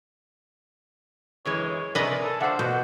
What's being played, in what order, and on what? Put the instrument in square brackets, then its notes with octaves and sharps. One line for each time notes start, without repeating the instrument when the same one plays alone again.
[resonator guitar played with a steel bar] F#2 E3 G#3 [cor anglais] C#5
[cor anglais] C#5
[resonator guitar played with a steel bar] C3 A#4 D5 [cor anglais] G#4 [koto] B4 D#5
[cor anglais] A4
[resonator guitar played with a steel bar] F3 C5 [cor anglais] D4 [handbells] E5 F#5 E6
[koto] B2 [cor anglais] F#4 [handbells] G6